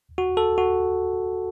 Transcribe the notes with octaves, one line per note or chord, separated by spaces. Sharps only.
F#4
A4
F#4